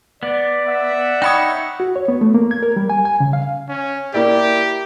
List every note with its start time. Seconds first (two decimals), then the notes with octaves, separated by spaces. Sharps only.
0.23 B3 D5
0.67 E5 F#5
1.22 D#4 C#5 G5 B5 D#6
1.80 F#4
1.96 C#5
2.08 B3
2.21 A3
2.34 A#3
2.51 G#6
2.63 A#4
2.76 G3
2.90 G#5
3.05 G#5
3.20 C#3
3.33 F5
3.69 C#4
4.14 A#3 E4 G4 D5